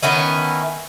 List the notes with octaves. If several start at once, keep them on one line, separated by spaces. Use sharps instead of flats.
D#3 B3 C#4 E4